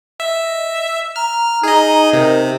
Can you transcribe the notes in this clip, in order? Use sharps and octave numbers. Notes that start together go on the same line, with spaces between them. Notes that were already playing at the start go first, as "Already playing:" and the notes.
D#5 E5
A#5 F6
D#4 G#4 D#5
C3 A#4